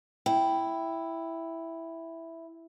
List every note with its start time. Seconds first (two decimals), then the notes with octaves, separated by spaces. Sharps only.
0.26 E4 G5